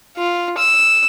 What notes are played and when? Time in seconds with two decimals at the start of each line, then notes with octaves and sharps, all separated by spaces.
0.17 F4
0.58 E6